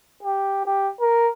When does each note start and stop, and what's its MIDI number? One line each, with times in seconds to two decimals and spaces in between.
0.23 0.63 67
0.66 0.90 67
1.01 1.31 70